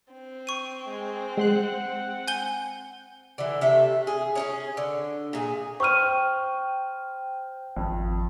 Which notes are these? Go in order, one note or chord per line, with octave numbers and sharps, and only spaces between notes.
C4
C#6 D#7
G#3
G#3 F#5 C6 F#6
G#5 G6 G7
D3 E3
C3 A3 E5
G#4
C#4 D4 G#4
D3
A#2 G#4
C5 G5 C#6 F6 D#7
G#1 F2